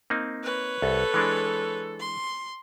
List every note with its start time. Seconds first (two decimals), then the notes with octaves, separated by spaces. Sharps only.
0.10 A#3 C4 D#4
0.43 B4 C#5
0.82 C2 A4
1.14 E3 G#3 D4
2.00 C6